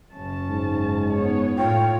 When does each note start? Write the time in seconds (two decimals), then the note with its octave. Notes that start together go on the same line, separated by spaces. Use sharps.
0.14 F#1 C#4 A5
0.49 G#2
1.13 B3 C#5
1.58 A2 F4 C#5 G5